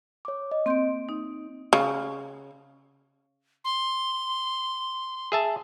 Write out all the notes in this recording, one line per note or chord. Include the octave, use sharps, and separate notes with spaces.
C#5 D6
D#5
A#3 C4 C6 G6 D7
D#4
C#3
C6
G#4 E5 A5